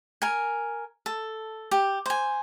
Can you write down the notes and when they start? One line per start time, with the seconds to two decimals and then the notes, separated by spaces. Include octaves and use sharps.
0.22 A#4 G#5
1.06 A4
1.71 G4
2.06 C5 G#5